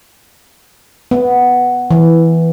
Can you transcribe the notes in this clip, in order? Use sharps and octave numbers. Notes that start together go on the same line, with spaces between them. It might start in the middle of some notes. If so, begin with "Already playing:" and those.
B3
E3